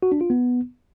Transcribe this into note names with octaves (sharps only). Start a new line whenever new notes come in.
F#4
D4
F4
B3